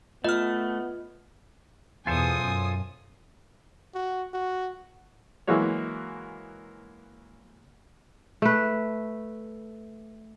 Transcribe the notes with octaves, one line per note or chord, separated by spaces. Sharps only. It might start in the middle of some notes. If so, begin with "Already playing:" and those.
A3 B3 F4 D#5 F6
E2 B2 F4 A4 C5 G#5 D#6
F#2
F#4
F#4
E3 F#3 G#3 A#3 F#4 C#5
A3 B4